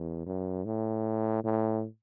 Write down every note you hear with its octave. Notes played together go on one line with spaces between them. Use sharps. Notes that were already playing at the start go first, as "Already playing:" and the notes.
Already playing: E2
F#2
A2
A2